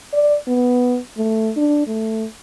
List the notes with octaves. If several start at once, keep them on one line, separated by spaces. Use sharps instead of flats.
D5
B3
A3
D4
A3